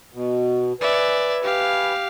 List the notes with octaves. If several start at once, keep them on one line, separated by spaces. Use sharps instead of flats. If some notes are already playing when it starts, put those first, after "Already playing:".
B2
B4 D5 E5 G#5
G4 F5